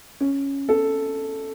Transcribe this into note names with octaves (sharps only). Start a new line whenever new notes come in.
C#4
A4